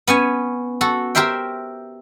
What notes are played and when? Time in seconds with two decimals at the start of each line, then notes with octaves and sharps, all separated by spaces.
0.07 B3 C#4 G#5
0.81 F#4 A4
1.15 G4 A#4 C5 E5 G5